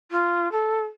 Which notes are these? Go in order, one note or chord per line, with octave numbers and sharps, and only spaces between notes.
F4
A4